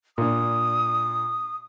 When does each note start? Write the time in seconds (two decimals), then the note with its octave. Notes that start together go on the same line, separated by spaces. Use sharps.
0.18 A#2 D4 D#6